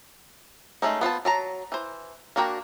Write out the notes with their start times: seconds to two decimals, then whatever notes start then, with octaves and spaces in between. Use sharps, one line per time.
0.82 G#3 A3 C#4 D#4
1.01 B3 F4 C5 A5
1.25 F#3 A5 A#5
1.72 E3 C5
2.36 A#3 D4 F#4 A#4 G5